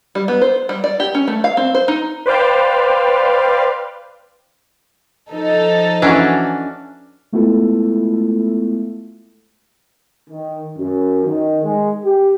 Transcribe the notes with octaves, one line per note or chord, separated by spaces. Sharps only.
G3
B3
C5
G3
D5
G4
C#4
A3
F5
C4
C5
D#4
B4 C5 D5 F5 G5
F3 D#4 A4
E3 C#4 D4 F#4
G#3 A3 B3 E4 F4 A4
D#3
F#2
D#3
G#3
G4